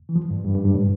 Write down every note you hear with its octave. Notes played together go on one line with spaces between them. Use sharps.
E3
F3
G2
G2
G2
G2
A2